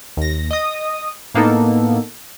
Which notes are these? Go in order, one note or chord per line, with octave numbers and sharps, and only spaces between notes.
D#2 A#6
D#5 D#6
A2 A#3 B3 D#4 A4